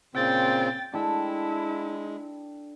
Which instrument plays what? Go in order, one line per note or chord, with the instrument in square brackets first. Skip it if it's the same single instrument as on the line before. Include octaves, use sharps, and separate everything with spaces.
[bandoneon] A#2 C#3 C4 [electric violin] G5 A6
[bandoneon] G#3 [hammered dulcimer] D4 A4 G5 [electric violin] E4